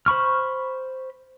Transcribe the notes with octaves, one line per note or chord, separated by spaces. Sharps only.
C5 B5 C#6 F6